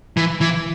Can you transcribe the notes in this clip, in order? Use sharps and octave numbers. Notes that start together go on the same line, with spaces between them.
E3
E3